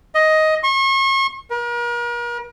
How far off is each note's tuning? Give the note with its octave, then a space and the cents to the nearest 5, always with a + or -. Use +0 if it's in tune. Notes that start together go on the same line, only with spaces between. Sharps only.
D#5 +10
C#6 -40
A#4 +40